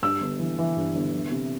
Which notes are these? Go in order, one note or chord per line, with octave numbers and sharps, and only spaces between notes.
G2 E6
G1
E3
E3
G2
G1
E3
C3